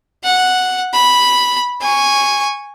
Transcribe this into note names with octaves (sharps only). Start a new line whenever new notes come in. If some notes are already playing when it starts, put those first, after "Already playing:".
F#5
B5
G#5 C#6